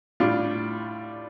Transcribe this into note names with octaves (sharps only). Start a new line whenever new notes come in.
A2 G3 D4 F4